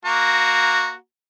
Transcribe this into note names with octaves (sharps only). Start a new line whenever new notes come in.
A#3 F#4 A#5